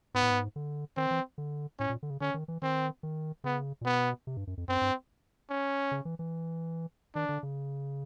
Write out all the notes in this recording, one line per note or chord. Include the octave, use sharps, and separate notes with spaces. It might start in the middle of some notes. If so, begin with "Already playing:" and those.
G#2 B3
A2
G#2
D3
D#3 C4
E3
D3
A2 C#4
A#2
D3
C#3
D3 C#4
D#3
E3
D#3 C4
D#3
C#3 B3
A#2
B2 B3
C3
G2
F#2
F2
F#2 C4
G2
C#4
C#3
E3
E3
D#3 D4
D3
C#3